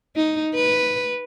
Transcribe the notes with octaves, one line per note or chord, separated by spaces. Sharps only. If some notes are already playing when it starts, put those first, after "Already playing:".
D#4
B4